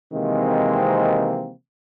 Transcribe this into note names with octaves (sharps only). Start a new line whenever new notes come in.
C3 D#3 E3 G#3 A#3 C4